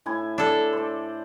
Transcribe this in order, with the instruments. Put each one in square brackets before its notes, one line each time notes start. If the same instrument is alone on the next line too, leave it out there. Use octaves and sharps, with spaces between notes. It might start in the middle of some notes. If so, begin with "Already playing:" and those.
[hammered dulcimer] A2 E4 G#5
[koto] D4 A4
[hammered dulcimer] C5 D5